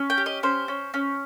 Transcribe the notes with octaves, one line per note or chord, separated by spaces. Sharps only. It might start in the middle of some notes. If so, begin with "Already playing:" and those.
Already playing: C#4
G5
G4
D#5
C#4 C5
C#4
C#4